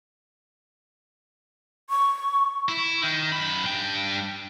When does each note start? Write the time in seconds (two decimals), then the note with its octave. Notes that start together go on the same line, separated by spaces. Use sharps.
1.90 C#6
2.68 E4
3.02 D#3 D#4
3.32 F#2 B5
3.66 G2 G5